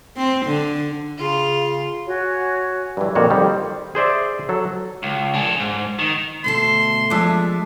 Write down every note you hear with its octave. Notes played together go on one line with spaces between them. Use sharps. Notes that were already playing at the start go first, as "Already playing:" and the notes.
C4
D3
C#3 F4
F#4 C#5 G#5
G2 E3
F2 A#2 D#3 F#4 C#5
F2 D#3 G3
C5
G#4 C5 D5 E5
F#3 A4
C#2
D4 G#4
G#2
D#3
D2 B2 A3 A4 C6
F3 G#3 D4 E5